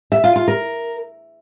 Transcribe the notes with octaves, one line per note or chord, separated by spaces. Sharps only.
E5
F4
F4
A#4